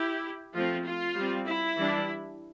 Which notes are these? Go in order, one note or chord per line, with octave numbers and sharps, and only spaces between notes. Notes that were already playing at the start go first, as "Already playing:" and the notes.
Already playing: E4 G4
F3 A3 C4 F4
F4
G3 C4
E4
E3 G3 D4